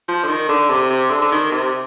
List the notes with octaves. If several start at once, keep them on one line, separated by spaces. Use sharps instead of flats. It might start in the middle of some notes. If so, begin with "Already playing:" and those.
F3
D3
D#3
D3
C3
C3
D3
D3
D#3
C3